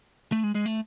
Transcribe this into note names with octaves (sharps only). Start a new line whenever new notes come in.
A3
G#3
G#3
A3